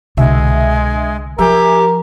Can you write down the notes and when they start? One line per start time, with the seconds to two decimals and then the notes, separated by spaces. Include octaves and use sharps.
0.17 C2 B2 D3 G#3 E5
1.39 F3 G4 A#4 E5 G#5